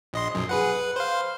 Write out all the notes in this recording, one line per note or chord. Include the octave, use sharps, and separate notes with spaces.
A#1 D#5 C6
B1 F#2
G#4 B4 F#5
B4
C5 F5